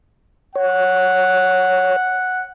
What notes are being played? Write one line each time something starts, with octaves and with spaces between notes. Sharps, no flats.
C#5 F#5